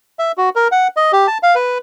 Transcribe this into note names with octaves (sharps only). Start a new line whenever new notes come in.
E5
F#4
A#4
F#5
D#5
G4
A5
F5
B4